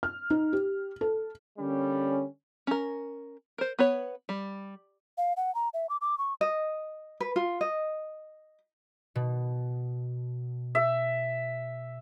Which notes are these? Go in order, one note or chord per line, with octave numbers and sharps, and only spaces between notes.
F6
D#4
G4
A4
D3 G3 A#3 C#4
C#4 A#4
A#4 C5
B3 B4 C#5
G3
F5
F#5
A#5
E5
D6
D6
C#6
D#5
B4
F4
D#5
B2
E5